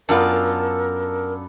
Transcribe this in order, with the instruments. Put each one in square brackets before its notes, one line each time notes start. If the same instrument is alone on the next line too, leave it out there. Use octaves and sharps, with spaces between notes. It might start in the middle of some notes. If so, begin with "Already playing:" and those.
[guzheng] F#2 [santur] B3 A4 [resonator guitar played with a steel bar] D4 F4 D5 [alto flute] A#4